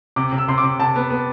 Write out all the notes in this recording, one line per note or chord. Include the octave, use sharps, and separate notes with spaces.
C3 D6
C3
E6
C3 C6
D6
C3
C3 A5
B3
B3